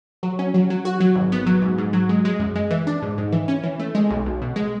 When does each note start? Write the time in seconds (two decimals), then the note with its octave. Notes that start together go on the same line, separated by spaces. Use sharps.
0.23 F#3
0.39 C#4
0.54 F#3
0.70 F#3
0.85 F#4
1.00 F#3
1.15 G#1
1.32 B3
1.46 F#3
1.62 G#2
1.78 G#2
1.93 F#3
2.09 G#3
2.25 G#3
2.39 F#2
2.56 G#3
2.71 E3
2.87 D4
3.02 G#2
3.18 G#2
3.32 E3
3.48 C#4
3.63 E3
3.80 A3
3.95 G#3
4.10 B1
4.26 B1
4.42 B2
4.56 G#3